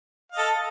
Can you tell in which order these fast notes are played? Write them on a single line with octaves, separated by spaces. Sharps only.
F5 D#5 A4